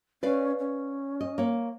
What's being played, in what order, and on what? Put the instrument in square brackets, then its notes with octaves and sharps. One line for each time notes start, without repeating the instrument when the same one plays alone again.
[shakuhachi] C#4 [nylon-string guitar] B4 D5 F5
[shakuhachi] C#4
[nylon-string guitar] D#5
A#3 C#5